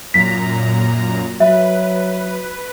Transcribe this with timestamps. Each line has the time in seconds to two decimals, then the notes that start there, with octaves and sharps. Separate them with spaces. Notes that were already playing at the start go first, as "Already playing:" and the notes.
0.14 F#2 A#2 A#5 B6
1.40 F#3 B4 E5